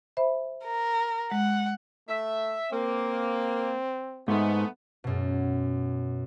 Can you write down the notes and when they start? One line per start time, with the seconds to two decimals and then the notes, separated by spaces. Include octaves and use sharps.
0.17 C5 E5 B5
0.64 A#4
1.32 G#3 F#5
2.08 A3 E5
2.72 A#3 C4
4.28 G#2 A3 B3
5.04 F#2 B2